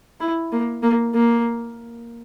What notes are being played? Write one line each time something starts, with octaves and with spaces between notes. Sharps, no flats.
E4
A#3
A#3
A#3